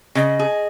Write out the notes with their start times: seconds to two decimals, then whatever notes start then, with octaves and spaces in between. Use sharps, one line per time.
0.15 C#3 D#5
0.39 G#4